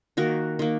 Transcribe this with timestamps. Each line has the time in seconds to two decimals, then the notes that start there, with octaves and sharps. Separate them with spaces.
0.17 D#3 A#3 F#4 A#4
0.59 D#3 A#3